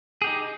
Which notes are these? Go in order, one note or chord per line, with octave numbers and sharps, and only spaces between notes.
D#4 G4 G#4